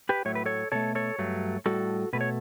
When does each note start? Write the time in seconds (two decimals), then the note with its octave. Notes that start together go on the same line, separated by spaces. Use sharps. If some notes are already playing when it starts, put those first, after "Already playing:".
0.09 G4 B4
0.25 A2 F#3 A3 C#5
0.35 B4
0.46 A4 C#5
0.72 B2 A3 A4 C#5
0.95 A4 C#5
1.18 G2 F#3 A3
1.66 A2 G3 F#4 A4
2.13 B2 A3 B4
2.21 C#5